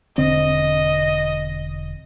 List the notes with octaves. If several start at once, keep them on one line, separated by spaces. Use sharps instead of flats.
E1 D3 C4 D#5